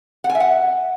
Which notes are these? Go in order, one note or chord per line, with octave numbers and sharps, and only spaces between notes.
F#5
G#5
E5
F#5